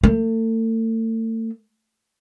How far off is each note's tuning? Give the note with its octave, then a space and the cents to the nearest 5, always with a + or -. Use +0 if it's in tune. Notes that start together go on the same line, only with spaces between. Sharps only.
A3 +40